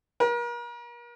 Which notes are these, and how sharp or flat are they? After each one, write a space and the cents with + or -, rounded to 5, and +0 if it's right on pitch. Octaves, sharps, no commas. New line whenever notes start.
A#4 +40